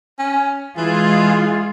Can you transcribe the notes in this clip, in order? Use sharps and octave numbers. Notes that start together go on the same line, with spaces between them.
C#4
E3 G#3 F4 G#4